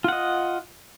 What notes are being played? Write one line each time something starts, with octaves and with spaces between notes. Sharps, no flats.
F4 D#5 F#5